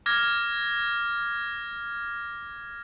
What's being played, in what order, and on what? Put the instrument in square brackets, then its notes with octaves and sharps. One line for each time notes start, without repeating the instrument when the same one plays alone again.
[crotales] D6 F6 G#6 A#6